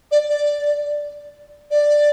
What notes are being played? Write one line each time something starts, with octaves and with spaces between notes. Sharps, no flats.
D5
D5
D5